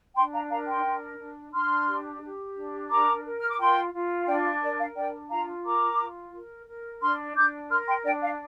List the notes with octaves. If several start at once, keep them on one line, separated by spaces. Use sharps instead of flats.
D4 G5 C6
F5 A#5
A#4 F5 A#5
G5 C6
D4
D4
D4 C6 F6
G4
G4
D4
A#4 A#5 D6
A#4
F6
D6
F4 G5 C6
F4
D4 D5 G5
F5
A#4 D5
F5
D4 D5 G5
F4 F5 A#5
A#4 A#5 D6
F4
A#4
A#4
D4 C6 F6
D4 D6 G6
A#4 C6 F6
G5 C6
D4 D5 G5
F5